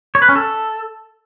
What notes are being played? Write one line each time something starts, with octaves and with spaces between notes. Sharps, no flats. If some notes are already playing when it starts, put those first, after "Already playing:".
C#5
B4
C#4
A4